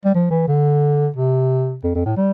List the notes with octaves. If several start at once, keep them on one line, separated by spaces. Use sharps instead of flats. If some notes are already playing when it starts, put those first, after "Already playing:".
G3
F3
E3
D3
C3
F2
F2
A2
G3